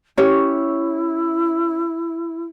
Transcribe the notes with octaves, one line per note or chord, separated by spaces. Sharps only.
C#4 E4 G4 C#5